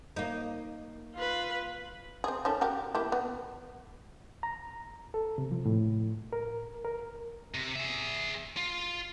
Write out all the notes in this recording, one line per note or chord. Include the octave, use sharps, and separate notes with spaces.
A#3 D#4
F4 B4
C4 G#4
D#3 C#4 A4
F#4 G4 A#4
A#3 E4 G4
B3
A#5
A4
C3
F3
A2
A#4
A#4
C3
G#4 E5
F4